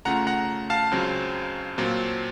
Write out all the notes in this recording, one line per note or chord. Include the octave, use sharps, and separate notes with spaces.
C#3 A3 C#4 F4 F#5 A#5
F#5 A#5
F5 A5
C#2 C#3 F#3 C4
A#2 F#3 C4 F4